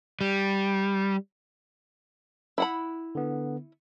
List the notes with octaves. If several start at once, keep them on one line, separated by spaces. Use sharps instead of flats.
G3
E4 F#5 B5
D3 B3